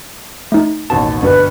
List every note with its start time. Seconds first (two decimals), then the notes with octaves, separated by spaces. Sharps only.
0.52 A3 D#4
0.90 A1 D#2 B2 A5
1.22 D2 G2 B2 B4